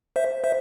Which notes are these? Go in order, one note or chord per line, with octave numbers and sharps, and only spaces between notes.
C5 E5
C5 E5